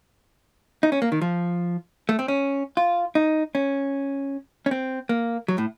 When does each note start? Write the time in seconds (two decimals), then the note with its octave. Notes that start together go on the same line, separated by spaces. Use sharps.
0.83 D#4
0.92 C#4
1.02 A#3
1.12 D#3
1.21 F3
2.09 A3
2.19 C4
2.28 C#4
2.77 F4
3.15 D#4
3.55 C#4
4.66 C#4
4.71 C4
5.09 A#3
5.48 F#3
5.58 A2